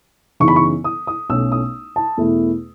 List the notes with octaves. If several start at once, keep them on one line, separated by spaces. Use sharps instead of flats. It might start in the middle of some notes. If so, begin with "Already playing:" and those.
F#2 C#3 E3 B3 D#4 C#6
B5
C#6
D#6
D#6
B1 B2 A3 C#4 E6
D#6
A5
E2 B2 A3 E4